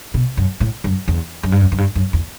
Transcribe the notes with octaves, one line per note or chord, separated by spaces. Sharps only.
B2
F#2
A2
F#2
E2
F#2
G2
F#2
F#2
G2
F#2
E2